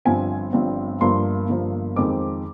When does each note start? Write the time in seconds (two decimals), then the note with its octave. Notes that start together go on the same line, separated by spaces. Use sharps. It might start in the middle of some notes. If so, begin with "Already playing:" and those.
0.05 G1 G2 F3 C4 G#5
0.53 G1 G2 F3 C4
1.01 G1 G2 F3 A#3 C6
1.49 G1 G2 F3 A#3
1.96 F2 D#3 G#3 C4 D#4 D6